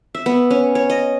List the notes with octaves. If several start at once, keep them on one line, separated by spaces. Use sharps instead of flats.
E5
B3
C#4
C#5
D#5